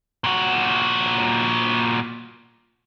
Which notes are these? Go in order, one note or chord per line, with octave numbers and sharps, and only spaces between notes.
A#2 F#4